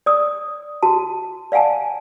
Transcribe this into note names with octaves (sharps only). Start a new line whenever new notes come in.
D5 D#6
F#4 A5
D5 F5 F#5 G#5 A5